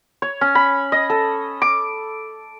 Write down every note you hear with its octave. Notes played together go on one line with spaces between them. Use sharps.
C#5
C#4
B5
D#5
A4
D6